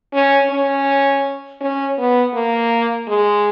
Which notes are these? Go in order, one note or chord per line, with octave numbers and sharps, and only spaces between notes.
C#4
C#4
C#4
B3
A#3
G#3